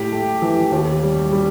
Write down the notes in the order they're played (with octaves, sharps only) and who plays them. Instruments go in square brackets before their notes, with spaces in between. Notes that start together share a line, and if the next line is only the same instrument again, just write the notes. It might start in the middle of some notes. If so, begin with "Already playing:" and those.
Already playing: [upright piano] A2 [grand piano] G4
[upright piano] A3
E3
[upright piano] D#2 [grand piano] G4
[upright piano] G3
G3